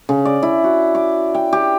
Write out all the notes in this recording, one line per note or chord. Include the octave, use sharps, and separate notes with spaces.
C#3
D5
E4
F#4
D6
G5
G4